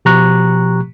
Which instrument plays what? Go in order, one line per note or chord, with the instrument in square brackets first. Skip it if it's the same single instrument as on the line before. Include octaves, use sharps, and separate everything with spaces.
[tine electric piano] B2 F3 G4 A#5 C#6 F#6